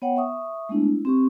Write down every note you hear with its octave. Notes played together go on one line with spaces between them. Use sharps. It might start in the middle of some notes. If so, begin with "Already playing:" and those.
B3 C#5 F#5 G5
E5 C#6 D#6
G#3 A3 B3 D4 E4
E4
C4 G4 C#6